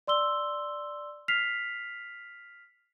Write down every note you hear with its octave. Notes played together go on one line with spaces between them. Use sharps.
D5 C6 E6 G7
F6 B6 C7 F7